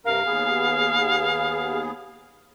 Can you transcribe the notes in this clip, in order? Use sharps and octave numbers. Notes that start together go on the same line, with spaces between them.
G2 C3 A#4 F5
D#2 B3 G#4